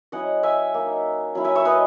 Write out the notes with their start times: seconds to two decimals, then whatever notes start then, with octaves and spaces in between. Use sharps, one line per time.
0.12 F#3 C#4 E4 D#5 F#5
0.43 E5 G#5
0.74 A#3 D#4
1.35 F#3 C#4 E4
1.44 E5 G#5
1.55 C#5 E5
1.65 B4 D#5